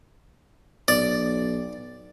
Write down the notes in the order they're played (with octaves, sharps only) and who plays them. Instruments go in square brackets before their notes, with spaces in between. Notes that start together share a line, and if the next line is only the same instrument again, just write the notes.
[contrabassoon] B1 [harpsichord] D5